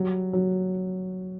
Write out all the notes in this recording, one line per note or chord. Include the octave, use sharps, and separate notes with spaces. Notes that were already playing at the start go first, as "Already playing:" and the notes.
Already playing: F#3 G3
F#3